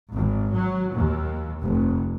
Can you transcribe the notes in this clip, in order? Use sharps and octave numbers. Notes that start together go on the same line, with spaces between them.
G#1
F#3
D#2
F1